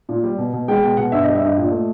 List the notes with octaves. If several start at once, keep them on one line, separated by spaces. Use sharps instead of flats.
A#2
G3
B2
B2
G#3 G5
B2 G5
B2 F#5
G2 E5
D#5
G3
E5
G2 D#5
A#2
A3